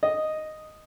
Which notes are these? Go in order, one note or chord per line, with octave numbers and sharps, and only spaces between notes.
D#5